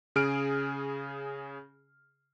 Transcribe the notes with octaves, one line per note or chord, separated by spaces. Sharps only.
C#3 G#4 F6 D7